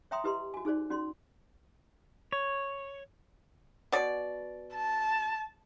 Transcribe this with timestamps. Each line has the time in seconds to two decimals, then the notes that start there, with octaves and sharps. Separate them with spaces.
0.11 C#5 E5 G5 A#5 C6 D#6
0.24 E4 G4 B4 D#5 A#5 C6
0.54 F#4 G#5
0.65 D#4 G#4 C5 D5
0.90 C#4 F#4 D5 C6
2.32 C#5
3.92 B2 D5
4.74 A5